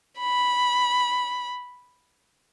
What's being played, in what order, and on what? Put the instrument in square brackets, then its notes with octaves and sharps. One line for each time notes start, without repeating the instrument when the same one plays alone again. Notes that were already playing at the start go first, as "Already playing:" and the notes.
[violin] B5